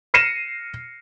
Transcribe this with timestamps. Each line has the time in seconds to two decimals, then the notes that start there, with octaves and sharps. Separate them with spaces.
0.14 F6 A#6 C7 C#7 D#7 E7